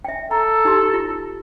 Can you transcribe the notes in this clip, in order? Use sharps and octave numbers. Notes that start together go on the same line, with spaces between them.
E5 G5
A4 A#5
D#4 G4 C6
F4